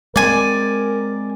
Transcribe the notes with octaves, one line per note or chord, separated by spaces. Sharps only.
G#3 C4 A#4 D5 G#5